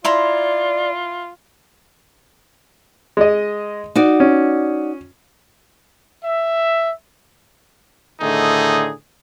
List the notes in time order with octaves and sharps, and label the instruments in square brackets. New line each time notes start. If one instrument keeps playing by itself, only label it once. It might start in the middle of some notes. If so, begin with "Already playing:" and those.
[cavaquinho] E4 A#5 C6 [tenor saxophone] F4 [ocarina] D5
[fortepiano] G#3 D#5
[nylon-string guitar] D#4 F#4 D5
[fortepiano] C#4
[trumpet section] E5
[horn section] A2 D3 D#3 A3 D#4 G#4